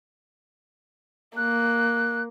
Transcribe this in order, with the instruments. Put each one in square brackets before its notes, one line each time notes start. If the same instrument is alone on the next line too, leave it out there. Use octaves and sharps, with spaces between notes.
[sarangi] A#3 [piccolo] F#6